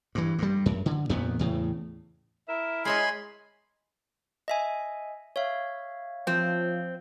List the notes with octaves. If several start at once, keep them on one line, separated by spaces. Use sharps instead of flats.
G2 E3
G2 G3
F#2
D3
F2 A#2 D#3 B3
E2 A2 C#3
E4 A#4 E5
G#3 G#4 C#5 D#5 G#5 B5 C6
D#5 E5 G#5
C#5 E5 F5
F3 C4